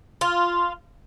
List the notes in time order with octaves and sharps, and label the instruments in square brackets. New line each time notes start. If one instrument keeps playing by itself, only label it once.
[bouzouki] F4